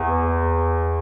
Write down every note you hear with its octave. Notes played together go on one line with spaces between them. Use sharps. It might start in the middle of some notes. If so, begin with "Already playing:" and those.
Already playing: E2